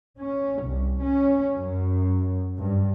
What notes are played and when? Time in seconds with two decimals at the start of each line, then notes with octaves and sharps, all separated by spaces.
0.19 C#4
0.64 C2
1.02 C#4
1.56 F#2
2.58 G2